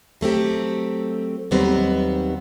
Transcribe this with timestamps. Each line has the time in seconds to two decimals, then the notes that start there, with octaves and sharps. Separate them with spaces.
0.21 F#3 A3 C4 G4
1.51 D#2 D#3 F#3 G3 B3 C4